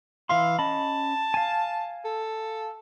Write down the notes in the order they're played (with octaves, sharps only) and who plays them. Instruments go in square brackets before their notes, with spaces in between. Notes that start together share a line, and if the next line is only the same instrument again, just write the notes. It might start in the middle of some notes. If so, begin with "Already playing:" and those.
[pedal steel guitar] E3 E5 C6 [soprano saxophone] F5
[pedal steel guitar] C#4 D#5 B5 [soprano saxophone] A5
[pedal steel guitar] F5 G#5
[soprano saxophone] A4